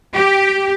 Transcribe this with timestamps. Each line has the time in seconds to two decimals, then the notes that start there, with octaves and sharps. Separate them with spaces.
0.14 G4